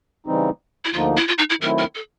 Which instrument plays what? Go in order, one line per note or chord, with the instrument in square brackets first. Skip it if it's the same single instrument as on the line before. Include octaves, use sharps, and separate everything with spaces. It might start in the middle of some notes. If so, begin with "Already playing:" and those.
[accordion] C#3 E3 G3 C4 D#4
[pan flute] E4
[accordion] D2 D3 F3 A#3 D#4 [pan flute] F4
[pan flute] E4
F4
D#4
E4
[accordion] D#3 F#3 A3 C4 E4 [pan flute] A#4
[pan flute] A#4
A4